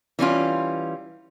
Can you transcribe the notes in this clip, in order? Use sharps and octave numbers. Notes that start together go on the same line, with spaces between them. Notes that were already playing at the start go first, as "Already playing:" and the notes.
E3 G3 C#4 F4